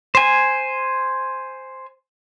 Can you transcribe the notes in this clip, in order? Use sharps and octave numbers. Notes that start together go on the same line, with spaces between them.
C5 G#5